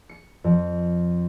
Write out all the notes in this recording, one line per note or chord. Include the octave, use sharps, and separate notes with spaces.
C#7
F2